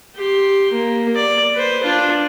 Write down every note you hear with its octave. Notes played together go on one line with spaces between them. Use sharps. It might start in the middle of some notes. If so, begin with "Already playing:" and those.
G4 C6
A#3
D5
B4 C5
D4 F4